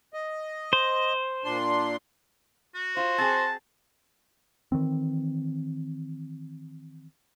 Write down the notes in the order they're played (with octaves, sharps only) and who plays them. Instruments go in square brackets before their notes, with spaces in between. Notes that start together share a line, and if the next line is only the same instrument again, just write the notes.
[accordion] D#5
[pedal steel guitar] C5
[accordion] A#2 D4 C6
[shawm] F#4
[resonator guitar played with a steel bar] F4 [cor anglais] C5
[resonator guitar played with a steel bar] C4 G#4 [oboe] A5
[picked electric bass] D#3 E3 C4